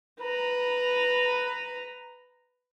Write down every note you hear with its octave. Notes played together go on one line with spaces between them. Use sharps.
B4 A#5